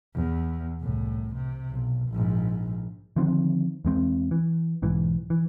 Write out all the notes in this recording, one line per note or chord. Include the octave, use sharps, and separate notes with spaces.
E2
C2 A2
C3
B1
A#1 G#2
D3 D#3 F3 C4
E2 G#3 C4
E3
B1 G#2 E3
E3